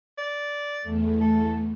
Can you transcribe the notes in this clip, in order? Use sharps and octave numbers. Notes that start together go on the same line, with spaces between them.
D5
E2 A3
A4